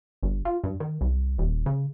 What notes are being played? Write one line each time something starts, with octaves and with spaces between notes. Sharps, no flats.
G1
F4
G2
D#3
C2
D#1
C#3